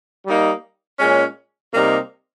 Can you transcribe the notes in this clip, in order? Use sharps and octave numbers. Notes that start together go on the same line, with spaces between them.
G3 A#3 D#4
A#2 G#3 C#4
C3 G3 A#3 D#4